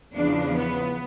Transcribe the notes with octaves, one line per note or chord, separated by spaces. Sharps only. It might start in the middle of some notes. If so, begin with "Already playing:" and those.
E2 C#3 F3 D4
B3